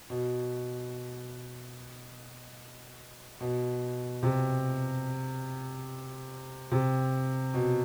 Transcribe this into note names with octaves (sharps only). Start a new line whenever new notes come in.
B2
B2
C3
C3
B2